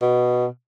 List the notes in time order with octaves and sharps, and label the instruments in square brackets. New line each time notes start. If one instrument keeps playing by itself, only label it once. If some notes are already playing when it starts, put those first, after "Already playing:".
[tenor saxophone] B2